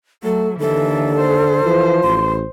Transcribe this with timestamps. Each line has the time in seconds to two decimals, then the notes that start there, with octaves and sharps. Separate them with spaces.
0.23 F#3 A3 A4
0.59 D#2 D3 E3 A4
1.20 C5
1.65 E3 F3
2.03 A1 C6